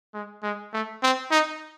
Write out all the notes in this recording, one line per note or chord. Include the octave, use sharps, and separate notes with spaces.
G#3
G#3
A3
C4
D#4